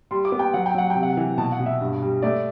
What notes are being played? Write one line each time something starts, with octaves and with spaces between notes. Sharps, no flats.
G3 C6
D6
B3
G5
F#3 F#5
G5
F#3 F#5
G5
C3
F#5
E3
B2 A5
F#5
B2
E5
G2
G3
A3 D5